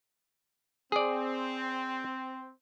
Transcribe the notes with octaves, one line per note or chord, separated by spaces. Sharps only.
C4 G#4 D5